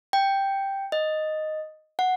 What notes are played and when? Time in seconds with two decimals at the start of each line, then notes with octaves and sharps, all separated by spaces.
0.13 G5
0.92 D#5
1.99 F#5